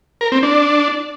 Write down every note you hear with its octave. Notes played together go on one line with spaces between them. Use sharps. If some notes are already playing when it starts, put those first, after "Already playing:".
A#4
C4
D4